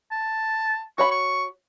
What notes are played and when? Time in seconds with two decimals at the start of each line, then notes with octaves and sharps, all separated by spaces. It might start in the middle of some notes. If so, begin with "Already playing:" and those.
0.11 A5
0.98 F#4 C#5 B5 C#6
1.11 C#6